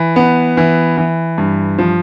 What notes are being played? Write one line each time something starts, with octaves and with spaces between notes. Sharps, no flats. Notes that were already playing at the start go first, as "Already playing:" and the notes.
Already playing: E3
B3
E3
E3
G2
F3